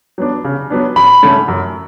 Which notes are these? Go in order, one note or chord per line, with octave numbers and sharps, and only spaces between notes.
F#3 B3 D4
C#3
F#3 B3 D4
F#2 B5
D3 A3 C#4
F#2